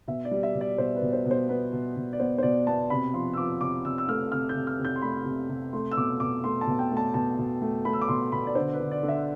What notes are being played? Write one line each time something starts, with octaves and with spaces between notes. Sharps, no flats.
B2 E5
D5
G3
E5
B2
D5
B2 C5
B4
B2
C5
B2
C5
B3 B4
B2
B2
D5
B3 C5
C5
B2 D5
B3 A5
C3 B5
F3 C6
E6
F3 D6
C3 D6
C3 E6
E6
A3 F6
C3 F6
G6
C3
F6
C3
G6
C6
A3 B5
C3
C3
A3 C6
E6
B2 D6
B2 D6
A3 C6
A5
B2
G5
A3
A5
B2 A5
B2
A3
A3 B5
E6
D6
B2 C6
B2 B5
D5
D3 C5
B4
D3
D5
D3
E5